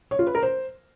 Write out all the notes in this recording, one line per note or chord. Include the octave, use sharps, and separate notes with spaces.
C#5
F4
B4
A#4
C5